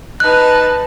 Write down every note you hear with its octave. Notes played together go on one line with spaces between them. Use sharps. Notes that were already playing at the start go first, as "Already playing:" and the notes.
D#4 B4 A5 F#6